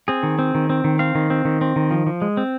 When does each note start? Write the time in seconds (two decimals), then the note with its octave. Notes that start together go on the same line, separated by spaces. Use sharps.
0.08 C4 G#4
0.23 D#3
0.39 C4
0.55 D#3
0.70 C4
0.84 D#3
0.99 C4 F5
1.15 D#3
1.30 C4
1.45 D#3
1.61 C4
1.76 D#3
1.91 F3
2.06 F3
2.22 G#3
2.37 C4